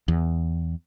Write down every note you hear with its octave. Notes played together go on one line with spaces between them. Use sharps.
E2